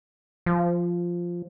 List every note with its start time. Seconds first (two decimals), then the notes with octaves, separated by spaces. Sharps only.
0.46 F3